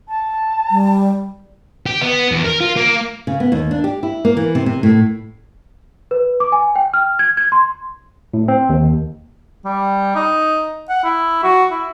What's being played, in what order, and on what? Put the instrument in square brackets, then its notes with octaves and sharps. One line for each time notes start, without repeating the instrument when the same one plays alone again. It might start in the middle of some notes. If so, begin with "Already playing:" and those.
[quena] A5
[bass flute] G3
[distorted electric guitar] G4
B3
E2
A#4
F4
A#3
[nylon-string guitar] C#3
B3
D#2
D4
G4
E4
A#3
E3
C3
C3
A2
[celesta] B4
D6
G#5
G5
F6
G#6
G#6
C6
[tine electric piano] A2
C4
D#2
[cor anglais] G3
D#4
F#5
E4
F#4
E4